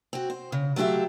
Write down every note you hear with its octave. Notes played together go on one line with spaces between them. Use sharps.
C4 F#4
C5
C#3
F#3 A3 F4 G4 E5